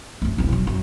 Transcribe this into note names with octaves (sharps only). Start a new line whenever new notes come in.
F#2 A3
E1 C2
F#3
F#2